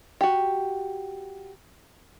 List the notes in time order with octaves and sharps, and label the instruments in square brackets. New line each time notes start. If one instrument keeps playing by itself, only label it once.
[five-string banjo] F#4 G4